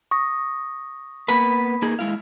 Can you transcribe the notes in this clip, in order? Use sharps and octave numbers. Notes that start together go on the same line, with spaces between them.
C#6 D#6 A#6
A#3 B3 B4 B5
A#3 D#4 G#4
G#3 E4 F5